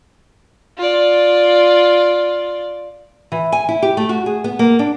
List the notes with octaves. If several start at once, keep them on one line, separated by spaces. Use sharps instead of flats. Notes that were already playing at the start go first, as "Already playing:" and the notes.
F4 D5
E3
G#5
E4
G4
A3
F#4
G#4
B3
A#3
D4